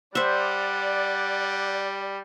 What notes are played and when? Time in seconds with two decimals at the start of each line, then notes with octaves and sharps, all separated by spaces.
0.15 G3 C5 D5 E5 F#5